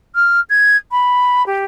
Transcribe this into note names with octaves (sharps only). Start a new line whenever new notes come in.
F6
G#6
B5
G4